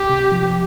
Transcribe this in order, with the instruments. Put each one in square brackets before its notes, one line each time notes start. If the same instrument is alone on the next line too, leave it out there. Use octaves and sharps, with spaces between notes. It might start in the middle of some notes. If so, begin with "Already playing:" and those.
Already playing: [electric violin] G4
[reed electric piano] C3
F3